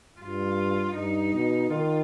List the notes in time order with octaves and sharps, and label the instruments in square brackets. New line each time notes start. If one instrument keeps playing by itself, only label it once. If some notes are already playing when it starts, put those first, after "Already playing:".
[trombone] G2 [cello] F4
[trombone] G2 [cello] D#4
[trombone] B2
[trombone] D#3 [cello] F4